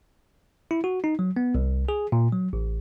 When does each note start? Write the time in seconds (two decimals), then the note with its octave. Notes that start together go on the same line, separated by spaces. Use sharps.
0.71 E4
0.84 F#4
1.04 D#4
1.19 F#3
1.37 B3
1.55 C2
1.89 G#4
2.12 A#2
2.33 F#3
2.53 A1